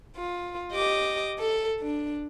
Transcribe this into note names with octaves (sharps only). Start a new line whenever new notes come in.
F4
G4 D#5 D6
A4
D4